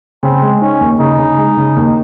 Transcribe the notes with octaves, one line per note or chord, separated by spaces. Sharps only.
C#3 C4
G#3
C#4 D#4
D#2
C#3 D#4
C#3
G#3
C#3
D#2